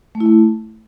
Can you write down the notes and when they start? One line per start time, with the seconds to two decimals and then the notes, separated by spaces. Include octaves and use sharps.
0.15 A3
0.20 E4
0.26 A3